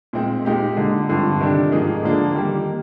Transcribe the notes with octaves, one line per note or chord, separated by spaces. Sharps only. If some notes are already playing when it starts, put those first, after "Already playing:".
A#2 G#3 C4
A#2 G#3 D#4 G4
D3 G#3 D#4
G2 D3 F3 C4
C3 D#3 G3 D4
G#2 F3 A#3 D#4 G#4
D3 F3 A#3 D4
D#3 G3 A#3